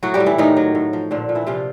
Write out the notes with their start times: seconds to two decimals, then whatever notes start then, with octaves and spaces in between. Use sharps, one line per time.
0.03 A2 F#3 F#4
0.14 G3 G4
0.20 A2
0.26 E3 E4
0.38 A2 D#3 D#4
0.57 F#3
0.75 A2
0.93 F3
1.11 A#2 D3 D4
1.29 A#2
1.35 E3 E4
1.47 C3 F3 F4